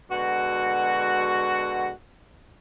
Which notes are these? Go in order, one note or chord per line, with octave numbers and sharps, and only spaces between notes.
B2 D3 G#3 F#4